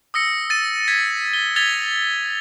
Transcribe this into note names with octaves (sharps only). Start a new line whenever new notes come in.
D#6 E6 A#6 C#7
A6 D#7
G#6 B6
G7
E6 G#6 A6 B6 F7 G7